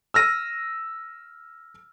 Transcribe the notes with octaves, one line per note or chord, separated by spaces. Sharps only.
E6 F6 A#6 D#7